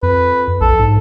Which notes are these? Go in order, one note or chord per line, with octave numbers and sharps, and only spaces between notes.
F2 B4
A#1 A4
G#2